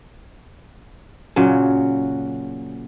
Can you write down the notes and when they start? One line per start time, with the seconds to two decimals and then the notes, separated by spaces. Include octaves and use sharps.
1.36 A#2 C#3 F#3